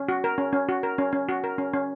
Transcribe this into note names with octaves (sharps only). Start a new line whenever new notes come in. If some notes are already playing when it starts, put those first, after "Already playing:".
Already playing: C#4
F#4
A#4
C#4
C#4
F#4
A#4
C#4
C#4
F#4
A#4
C#4
C#4